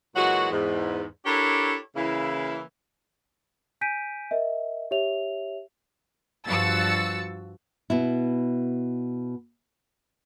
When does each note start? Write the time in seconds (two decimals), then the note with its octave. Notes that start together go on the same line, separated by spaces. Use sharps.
0.16 A#2 E3 F#3 G#3 F#4
0.51 E2 G#2
1.26 D4 E4 G4 A4 A#4 C#5
1.97 C#3 E3 A#3 E4
3.81 G#5 G6 B6 D7 D#7
4.31 A#4 D#5 E5
4.91 G4 C#5 E5 F7
6.46 G2 F3 F#4 E6 A6 C#7
7.90 B2 B3 E4